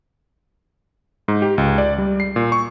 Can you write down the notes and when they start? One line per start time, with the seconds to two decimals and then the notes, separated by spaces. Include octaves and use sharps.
1.28 G#2
1.42 G4
1.58 C#2
1.78 D5
1.98 G3
2.20 C7
2.36 A#2
2.52 C#6